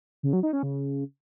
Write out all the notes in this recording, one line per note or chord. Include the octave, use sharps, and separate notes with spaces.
C#3
F#3
D#4
C#4
C#3